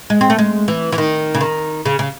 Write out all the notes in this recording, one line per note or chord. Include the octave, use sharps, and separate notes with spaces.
G#3
C4
A3
G#3
E3
E3
D#3
C#3
D#3
C#3
C#3